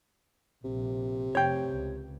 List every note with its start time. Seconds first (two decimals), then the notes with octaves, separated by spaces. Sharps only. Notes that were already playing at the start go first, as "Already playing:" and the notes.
0.64 A#1 C3
1.35 F1 C#5 G5
1.68 C#2